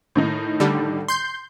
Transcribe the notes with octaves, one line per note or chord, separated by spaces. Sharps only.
A2 D#3 D#4
D3 G3
C6 G6